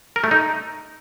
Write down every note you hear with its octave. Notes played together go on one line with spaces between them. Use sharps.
A#4
A3
D#4